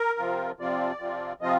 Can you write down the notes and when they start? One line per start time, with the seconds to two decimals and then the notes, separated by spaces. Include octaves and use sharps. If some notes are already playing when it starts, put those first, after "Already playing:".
Already playing: A#4
0.19 C3 F3 C4 F4
0.59 C3 F3 C4 F4 D5
1.00 C3 F3 C4 F4
1.41 C3 F3 C4 F4 D#5